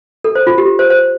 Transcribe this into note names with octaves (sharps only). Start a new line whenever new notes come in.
A4
C5
F4
G4
C5
C5